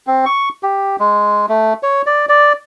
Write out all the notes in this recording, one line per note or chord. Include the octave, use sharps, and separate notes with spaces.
C4
C#6
G4
G#3
A3
C#5
D5
D5